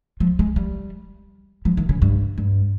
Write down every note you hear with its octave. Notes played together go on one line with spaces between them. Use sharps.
F3
G#3
G3
F3
D#3
C#3
G2
G2